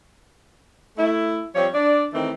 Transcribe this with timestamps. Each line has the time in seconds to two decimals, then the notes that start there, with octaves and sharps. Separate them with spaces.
0.97 A3 E4
1.55 F3 G3 C4 C#5
1.73 D4 D5
2.13 D#3 E3 A3 C4 D#4